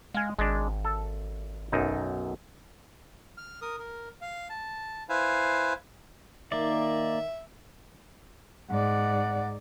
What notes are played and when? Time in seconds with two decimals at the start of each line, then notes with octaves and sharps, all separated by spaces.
0.14 G#3 F5 G#5
0.39 G#1 G#3 D4
0.85 A4
1.72 B1 F#2 D#4
3.38 F6
3.62 A#4 D#6
3.79 A#4
4.21 F5
4.50 A5
5.09 E4 B4 C5 F5 G#5
6.52 D#3 A#3 D5 E5
8.70 G#2 D5 F#5